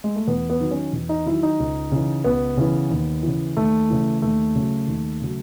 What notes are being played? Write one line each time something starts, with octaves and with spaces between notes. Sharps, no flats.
G#3
A3
E2 B3
B3
D#3 F#3
C#4
E2
D#4
D#3 F#3 E4
D#4
C#2
C#3 E3
C#2 B3
C#3 E3
D#2
C#3 E3
D#2 A3
C#3 E3
D#2 A3
C#3 F#3
D#2
C#3 F#3